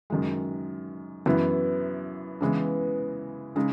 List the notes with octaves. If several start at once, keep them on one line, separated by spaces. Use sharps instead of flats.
F#2 D#3 G#3
F#2 E3 B3 E4
C#3 E3 G#3 B3
C#3 G#3 D#4